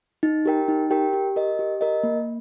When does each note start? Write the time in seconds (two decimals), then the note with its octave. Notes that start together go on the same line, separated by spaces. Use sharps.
0.23 D#4
0.45 G4 A#4 G5
0.68 D#4
0.90 G4 A#4 G5
1.13 G4
1.36 A#4 D#5
1.59 G4
1.81 A#4 D#5
2.03 A#3